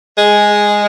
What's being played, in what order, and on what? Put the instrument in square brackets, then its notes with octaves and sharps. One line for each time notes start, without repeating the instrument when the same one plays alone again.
[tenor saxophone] G#3